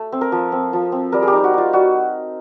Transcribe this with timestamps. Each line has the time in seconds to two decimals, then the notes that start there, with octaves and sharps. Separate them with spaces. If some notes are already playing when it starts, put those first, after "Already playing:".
Already playing: A3
0.12 C4
0.21 A#4
0.32 F3
0.52 C4
0.73 F3
0.92 C4
1.12 G3 A#4
1.22 G#4
1.27 G4
1.33 D#4
1.44 F#4
1.54 D#4 F4
1.73 G3 F#4